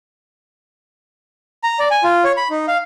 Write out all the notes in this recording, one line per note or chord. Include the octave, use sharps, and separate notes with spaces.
A#5
D5
G#5
F4
C#5
B5
D#4
F5